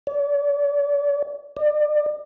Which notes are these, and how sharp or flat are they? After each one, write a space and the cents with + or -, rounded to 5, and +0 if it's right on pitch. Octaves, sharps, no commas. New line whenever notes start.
D5 -40
D5 +30